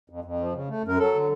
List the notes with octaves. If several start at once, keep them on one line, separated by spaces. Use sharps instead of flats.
F2
F2
F3
C#3
A3
F#2 A#4
F#3 A4
D3